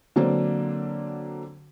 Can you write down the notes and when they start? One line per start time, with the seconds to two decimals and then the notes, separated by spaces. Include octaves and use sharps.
0.16 D3 F#3 A#3 C4 D4